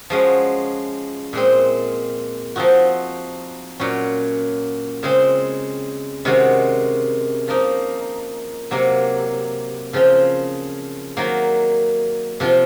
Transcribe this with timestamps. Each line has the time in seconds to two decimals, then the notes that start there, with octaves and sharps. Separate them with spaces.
0.10 F3 G#3 C#4 F#4
1.33 A#2 G#3 C4
2.56 F3 C4 D#4 F#4
3.79 A#2 F#3 C#4 F#4
5.03 C#3 G#3 C4
6.25 C3 D#3 G#3 C#4 F#4
7.48 F3 A#3 D#4
8.71 C3 F#3 A#3
9.93 C#3 F3 C4 F4
11.17 D#3 F#3 A#3
12.40 C3 F3 C4 F4